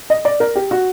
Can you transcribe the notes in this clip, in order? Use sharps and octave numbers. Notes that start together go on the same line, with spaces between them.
D#5
D5
A#4
G4
F#4